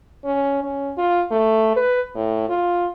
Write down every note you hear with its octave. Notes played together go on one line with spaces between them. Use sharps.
C#4
C#4
F4
A3
B4
A2
F4